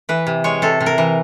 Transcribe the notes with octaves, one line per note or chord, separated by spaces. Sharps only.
E3 B4
C3
G#3 C#5
C3 A4
C3
A#4
E3